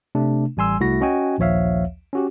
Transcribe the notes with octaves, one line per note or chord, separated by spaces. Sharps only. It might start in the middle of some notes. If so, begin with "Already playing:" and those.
C3 A3 D4
A1 G3 G#5 C6 E6
C2 A3 E4 F#4 A#6
C#4 F#4 D#5 G5 G#5
A#1 D#2 F3 C#5 E5 F5
C#4 F#4 G4